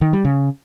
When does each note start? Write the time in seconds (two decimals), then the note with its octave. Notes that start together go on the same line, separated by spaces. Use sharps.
0.01 D#3
0.13 G3
0.25 C#3